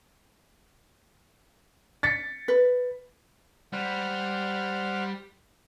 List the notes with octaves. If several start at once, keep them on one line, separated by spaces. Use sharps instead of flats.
A6 B6 C#7
B4
G3 C5 F#5 F6